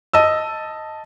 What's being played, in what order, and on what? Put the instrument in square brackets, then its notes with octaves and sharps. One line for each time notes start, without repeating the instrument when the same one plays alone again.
[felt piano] D#5 A5 E6